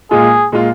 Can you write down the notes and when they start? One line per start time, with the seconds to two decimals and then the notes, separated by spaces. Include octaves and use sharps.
0.11 A#2 G#3 F4 G#4
0.52 A#2 G#3 F4